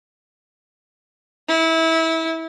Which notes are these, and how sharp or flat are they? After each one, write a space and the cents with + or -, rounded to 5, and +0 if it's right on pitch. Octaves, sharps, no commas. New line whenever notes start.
E4 -25